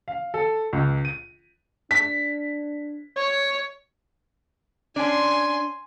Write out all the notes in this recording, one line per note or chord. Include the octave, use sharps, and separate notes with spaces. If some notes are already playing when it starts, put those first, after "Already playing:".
F5
A4
C#2
D#7
D4 B6
C#5
C#4 D4 G#5 C6